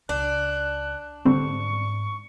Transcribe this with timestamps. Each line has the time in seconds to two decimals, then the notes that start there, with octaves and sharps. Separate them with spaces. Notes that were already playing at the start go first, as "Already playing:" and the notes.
0.09 C#2 D4 F#6
1.25 G#2 D3 G3 C4 C#6